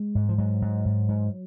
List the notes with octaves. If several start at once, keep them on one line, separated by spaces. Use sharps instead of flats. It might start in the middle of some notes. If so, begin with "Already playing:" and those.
Already playing: G#3
G#2
F3
G#2 F#3
G#2
G#2
G#2